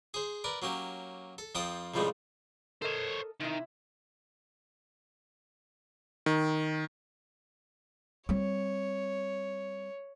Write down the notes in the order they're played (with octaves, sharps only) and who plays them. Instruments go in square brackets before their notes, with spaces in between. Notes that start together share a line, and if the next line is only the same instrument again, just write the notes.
[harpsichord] G#4 C5
A#4 B4 D5
F#3 A#3 C#4 G4
A4
F2 F3 G5 A5 D#6
C#2 A2 C3 F3 G3 G#3
[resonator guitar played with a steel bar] A4 A#4 D#5 [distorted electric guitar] C5 C#5
[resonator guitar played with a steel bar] C3 E4 [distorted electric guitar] D#3
[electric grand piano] D#3
[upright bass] G3 C4 [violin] C#5